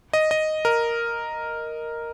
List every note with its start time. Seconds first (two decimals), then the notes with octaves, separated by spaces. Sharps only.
0.13 D#5
0.31 D#5
0.65 A#4